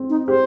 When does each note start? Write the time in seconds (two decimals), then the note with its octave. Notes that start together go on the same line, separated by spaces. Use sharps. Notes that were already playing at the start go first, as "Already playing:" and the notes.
Already playing: C4
0.10 D#4
0.28 G4 C5